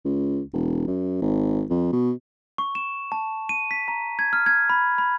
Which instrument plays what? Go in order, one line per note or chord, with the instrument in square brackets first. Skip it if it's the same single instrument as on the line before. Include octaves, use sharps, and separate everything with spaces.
[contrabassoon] C#2
E1
F#2
G#1
F2
B2
[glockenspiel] C#6
E7
A5
D#7
B6
A#5
G#6
F6
G#6
B5
B5